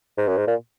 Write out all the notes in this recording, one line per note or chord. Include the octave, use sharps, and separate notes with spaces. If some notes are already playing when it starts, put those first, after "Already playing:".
G#2
F#2
G#2
A#2